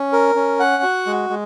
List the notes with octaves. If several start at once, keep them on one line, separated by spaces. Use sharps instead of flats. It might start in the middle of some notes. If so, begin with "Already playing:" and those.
Already playing: C#4
A#4
C#4
F#5
F#4
G#3
G#3